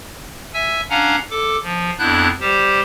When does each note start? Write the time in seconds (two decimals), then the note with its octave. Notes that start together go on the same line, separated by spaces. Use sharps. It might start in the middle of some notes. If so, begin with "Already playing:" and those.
0.54 E5 G#5 E6
0.90 C#4 D4 F5 F#5 G#5 A#5
1.31 A4 D6
1.63 F3
1.99 F2 B3 D4 E4 F#6 G6
2.40 G3 G4 C5